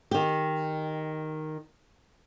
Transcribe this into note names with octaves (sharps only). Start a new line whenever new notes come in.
D#3 G4